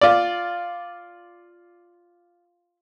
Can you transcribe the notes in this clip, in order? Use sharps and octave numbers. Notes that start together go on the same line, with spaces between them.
F4 D5